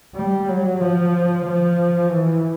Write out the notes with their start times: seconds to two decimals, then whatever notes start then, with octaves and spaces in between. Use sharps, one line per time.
0.15 G3
0.48 F#3
0.80 F3
1.45 F3
2.10 E3